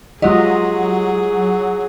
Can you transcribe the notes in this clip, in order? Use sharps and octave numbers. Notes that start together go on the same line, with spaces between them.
F#3 G#3 F4 G4 G#4 D#5